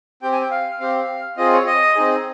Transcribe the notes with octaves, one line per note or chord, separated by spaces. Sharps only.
C4 G4 G5
G#5
G5
F5
C4 G4 F5
C4 F4 G#4 D#5
C#5
D#5
C4 D#4 G#4